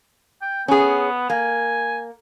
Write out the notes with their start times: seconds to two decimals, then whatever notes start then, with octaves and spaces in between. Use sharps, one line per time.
0.42 G5
0.68 B3 C#4 G#4
1.30 A#3 G#5